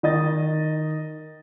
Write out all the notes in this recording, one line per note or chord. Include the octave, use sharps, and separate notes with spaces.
D#3 D#5 A6